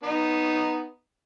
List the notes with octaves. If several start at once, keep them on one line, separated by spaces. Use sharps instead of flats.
B3 D#4